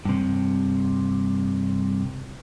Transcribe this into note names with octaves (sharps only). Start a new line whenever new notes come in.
G2 C3